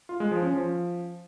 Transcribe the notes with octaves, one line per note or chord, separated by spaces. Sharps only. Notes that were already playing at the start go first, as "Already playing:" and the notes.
F4
G#3
F3
C#4
F3